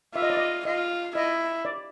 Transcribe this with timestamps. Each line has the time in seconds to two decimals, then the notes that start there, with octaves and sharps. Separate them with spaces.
0.15 F4 E5
0.22 D#5
0.30 D5
0.37 D#5
0.65 F4 D#5
1.15 E4 D#5
1.65 D5